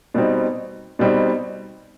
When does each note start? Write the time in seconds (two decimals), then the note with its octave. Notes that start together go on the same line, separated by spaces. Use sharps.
0.14 B2 G3 C4 D#4
0.99 B2 G3 C4 D#4